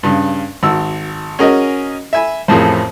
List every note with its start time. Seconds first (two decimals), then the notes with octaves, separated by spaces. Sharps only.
0.03 G2 C#3
0.63 G#1 F#4 E6
1.39 C#4 F#4 G#4 A#4 D#5
2.13 E5 G#5 B5
2.48 A1 F2 A2 C4 G#4 A#4